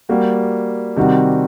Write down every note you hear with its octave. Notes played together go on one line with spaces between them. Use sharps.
G3 A#3 F#4
C3 D#3 G3 C4 F#4